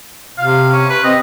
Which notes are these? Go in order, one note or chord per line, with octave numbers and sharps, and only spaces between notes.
C3 F5
C#4
B4
C4 D#5